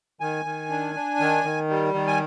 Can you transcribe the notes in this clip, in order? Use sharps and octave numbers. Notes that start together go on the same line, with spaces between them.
D#3 G#5
D#3
D4
D4
D#3
D#3
G3
D#3
G#5